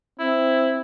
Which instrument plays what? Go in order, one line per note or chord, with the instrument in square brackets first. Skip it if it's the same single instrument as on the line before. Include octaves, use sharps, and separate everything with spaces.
[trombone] C4 [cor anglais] E4